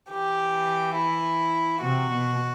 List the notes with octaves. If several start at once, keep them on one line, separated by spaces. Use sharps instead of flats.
E3 G4
E4
C3 F#4
B2